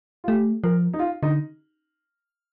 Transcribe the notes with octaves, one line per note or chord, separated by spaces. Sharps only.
F4
A3 G4
F3 A#4
D#4
F4
D3 D#4